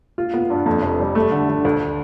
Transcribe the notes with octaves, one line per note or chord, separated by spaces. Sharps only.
F4
B3
G2
F2
F1
G3
A3
D3
D3
D2